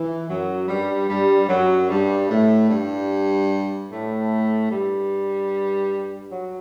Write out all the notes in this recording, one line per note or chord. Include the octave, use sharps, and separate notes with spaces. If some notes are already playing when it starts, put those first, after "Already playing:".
Already playing: E3
F#2 F#3
G2 G3
G2 G3
F#2 F#3
G2 G3
A2 A3
G2 G3
A2 A3
G2 G3
F#3